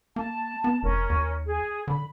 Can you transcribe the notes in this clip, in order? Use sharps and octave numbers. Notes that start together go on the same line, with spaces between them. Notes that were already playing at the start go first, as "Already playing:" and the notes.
A#3 A5
B3
F1 C#4 A#4
D#2
G#4
D3 B5